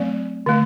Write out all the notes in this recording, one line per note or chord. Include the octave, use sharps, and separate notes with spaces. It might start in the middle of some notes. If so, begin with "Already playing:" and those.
Already playing: F#3 A3 C4 D5
D3 A3